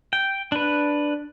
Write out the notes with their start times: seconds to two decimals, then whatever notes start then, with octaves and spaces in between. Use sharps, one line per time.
0.13 G5
0.52 D4 B4